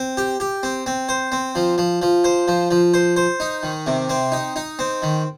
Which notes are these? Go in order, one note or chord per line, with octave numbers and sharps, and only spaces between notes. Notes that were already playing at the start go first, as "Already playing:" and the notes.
Already playing: C4
G4
G4
C4
C4
C5
C4
F3
F3
F3
C5
F3
F3
C5
C5
D#4
D#3
C3
C4
D#4
D#4
C4
D#3